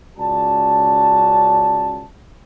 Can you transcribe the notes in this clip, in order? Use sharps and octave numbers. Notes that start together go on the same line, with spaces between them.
C#2 C#4 F#4 D5 A5